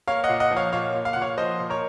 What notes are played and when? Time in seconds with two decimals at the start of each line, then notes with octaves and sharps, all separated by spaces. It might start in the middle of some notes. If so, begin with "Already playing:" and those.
0.08 A#3 C#5 F5
0.24 D#5 F#5
0.29 A#2
0.40 D#5 F#5
0.51 F3
0.56 C#5 F5
0.73 A#2 C#5 F5
0.94 A#2
1.05 F5
1.13 A#2 F#5
1.22 C#5 F5
1.38 F3 C5 D#5
1.60 A#2
1.70 A#4 C#5